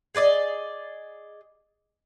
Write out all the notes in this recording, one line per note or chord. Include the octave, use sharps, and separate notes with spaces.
G#4 B4 D5 D#5